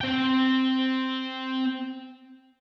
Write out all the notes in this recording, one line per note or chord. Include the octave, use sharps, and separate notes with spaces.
C4 G5